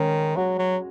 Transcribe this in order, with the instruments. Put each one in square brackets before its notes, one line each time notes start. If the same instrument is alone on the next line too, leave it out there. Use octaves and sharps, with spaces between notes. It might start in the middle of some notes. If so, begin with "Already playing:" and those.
Already playing: [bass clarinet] D#3 [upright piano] G#3 C#4
[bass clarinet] F#3 [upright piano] F#4
[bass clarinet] F#3